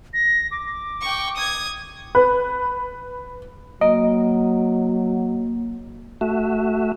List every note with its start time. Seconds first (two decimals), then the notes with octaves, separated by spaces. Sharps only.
0.14 A#6
0.51 D6
1.01 G5 C#6
1.36 D#6 G#6
2.15 B4
3.81 F#3 A#3 D#5
6.21 A3 F#4 E5